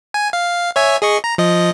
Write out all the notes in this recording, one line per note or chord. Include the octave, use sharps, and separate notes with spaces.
G#5
F5
C#5 E5 G#5
G#4 D#5 C#6
A#5
F3 D#5